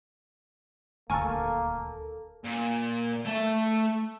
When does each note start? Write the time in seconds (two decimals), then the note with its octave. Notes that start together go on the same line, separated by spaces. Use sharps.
1.10 D#1 D2 A#3 A4 A#4 G#5 C#6 F6
2.44 A#2
3.25 A3 A5